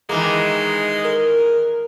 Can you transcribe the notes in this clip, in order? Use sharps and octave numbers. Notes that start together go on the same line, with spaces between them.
D#3 E3 G#3 A#3
A#4